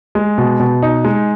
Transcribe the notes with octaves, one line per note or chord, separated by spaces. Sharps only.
G#3
B2
B2
D#4
G#3